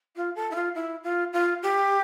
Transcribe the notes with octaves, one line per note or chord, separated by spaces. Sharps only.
F4
A4
E4
F4
E4
F4
F4
G4